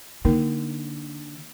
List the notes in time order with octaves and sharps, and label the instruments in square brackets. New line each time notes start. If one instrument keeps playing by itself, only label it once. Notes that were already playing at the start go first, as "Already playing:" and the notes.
[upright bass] D3 [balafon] A#3 D#4 A#4